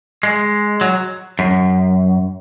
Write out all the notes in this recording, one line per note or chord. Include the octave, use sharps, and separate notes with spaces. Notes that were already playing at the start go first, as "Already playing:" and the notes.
G#3
F#3
F#2